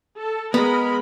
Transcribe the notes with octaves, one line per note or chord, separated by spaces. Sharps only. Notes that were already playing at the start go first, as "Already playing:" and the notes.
A4
G#3 B3 A#4 B5